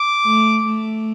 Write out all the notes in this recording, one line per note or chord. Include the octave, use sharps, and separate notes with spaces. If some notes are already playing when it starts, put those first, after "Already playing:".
Already playing: D6
A3
A3